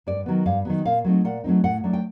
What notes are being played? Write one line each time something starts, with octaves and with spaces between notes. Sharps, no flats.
G2 D5
D#3 F#3 B3
G2 F5
D#3 F#3 B3
A#2 F5
F#3 A3 C4 D#4
A#2 F#5
F#3 A3 C4 D#4
A2 F#5
F#3 A3 D4
G5